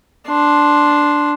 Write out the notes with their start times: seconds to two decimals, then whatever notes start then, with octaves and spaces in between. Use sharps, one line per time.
0.28 D4 C6